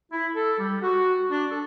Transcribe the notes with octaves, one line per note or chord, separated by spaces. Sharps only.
E4
A4
G3
F#4
D4
A4